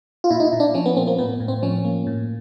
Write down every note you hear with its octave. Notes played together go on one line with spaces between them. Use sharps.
F4
A#2 E4
D#4
E4
A#2
D4
F3 C#4
B3
A#3 C4
A#3
A2 B3
A2
C4
F3 C#4
A#3
A2